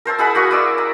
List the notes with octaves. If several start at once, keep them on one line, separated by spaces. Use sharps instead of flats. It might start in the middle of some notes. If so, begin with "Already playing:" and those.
A#4 C5 A5 E6
E4 G#4 F#5 B5
A#3 F#4 C#6 D#6
E4 D5 E6
A#5